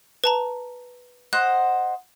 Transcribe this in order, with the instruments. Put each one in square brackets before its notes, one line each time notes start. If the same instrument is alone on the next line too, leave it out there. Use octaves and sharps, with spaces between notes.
[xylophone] B4 A5 A#5
[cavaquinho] C5 D#5 F#5 [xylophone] F#6